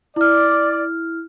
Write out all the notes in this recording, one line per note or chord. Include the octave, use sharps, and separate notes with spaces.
E4 D5 F6